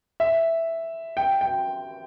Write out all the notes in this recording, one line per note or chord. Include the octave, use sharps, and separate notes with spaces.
E5
G5
G5